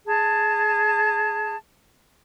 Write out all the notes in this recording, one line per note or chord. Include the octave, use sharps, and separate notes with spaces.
G#4 A5